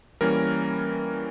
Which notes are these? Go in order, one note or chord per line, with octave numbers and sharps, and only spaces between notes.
E3 G3 A#3 C#4 A#4